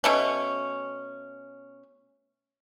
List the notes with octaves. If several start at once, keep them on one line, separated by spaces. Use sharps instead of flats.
B2 A3 C#4